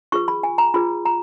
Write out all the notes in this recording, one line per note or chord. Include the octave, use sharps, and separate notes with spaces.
F4 G#4 B4 C#6
B5
G#5
A#5
F4 G#4 B4 B5
A#5